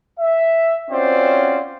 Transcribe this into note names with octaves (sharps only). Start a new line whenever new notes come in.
E5
C4 C#4 F4 F#4 C5 D5